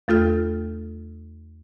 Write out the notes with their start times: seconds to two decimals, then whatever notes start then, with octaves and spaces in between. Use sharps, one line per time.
0.08 E2 A3 F4 A4 F6